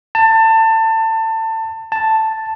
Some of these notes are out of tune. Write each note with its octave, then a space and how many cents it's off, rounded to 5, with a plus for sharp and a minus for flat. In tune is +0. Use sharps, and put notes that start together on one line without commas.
A5 +25
A5 +5